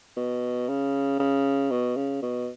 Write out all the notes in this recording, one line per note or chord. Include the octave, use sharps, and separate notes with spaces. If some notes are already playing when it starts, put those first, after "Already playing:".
B2
C#3
C#3
B2
C#3
B2